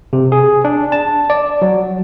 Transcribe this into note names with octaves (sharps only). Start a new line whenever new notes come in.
C3
G#4
D4
A5
D5
F#3